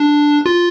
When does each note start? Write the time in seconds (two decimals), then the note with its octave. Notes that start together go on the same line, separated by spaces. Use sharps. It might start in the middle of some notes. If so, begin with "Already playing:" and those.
Already playing: D4
0.46 F4